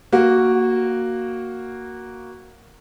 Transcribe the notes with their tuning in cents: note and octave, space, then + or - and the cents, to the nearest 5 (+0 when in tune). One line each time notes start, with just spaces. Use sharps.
A#3 +0 F#4 +0